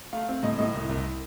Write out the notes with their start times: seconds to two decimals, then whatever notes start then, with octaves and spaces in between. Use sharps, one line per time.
0.13 A3 F5
0.28 C4
0.43 A2 D#5
0.58 A2 D#5
0.74 C2
0.89 C2